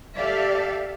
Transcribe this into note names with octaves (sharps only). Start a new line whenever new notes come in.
G4 A4 D5 E5 F5